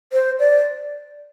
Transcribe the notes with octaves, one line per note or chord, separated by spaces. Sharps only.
C5
D5